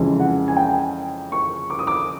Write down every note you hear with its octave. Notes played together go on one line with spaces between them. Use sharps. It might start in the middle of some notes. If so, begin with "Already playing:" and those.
Already playing: F2 C#3 E3 G#3
F#5
G#5
G5
C#6
D6
D#6
D6